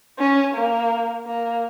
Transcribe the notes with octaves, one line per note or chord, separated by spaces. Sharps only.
C#4
A#3
A#3